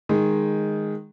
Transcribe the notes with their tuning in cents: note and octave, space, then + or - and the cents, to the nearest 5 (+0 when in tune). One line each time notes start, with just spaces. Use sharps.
D#3 +0 G#3 +0